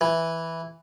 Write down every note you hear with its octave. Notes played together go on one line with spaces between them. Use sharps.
E3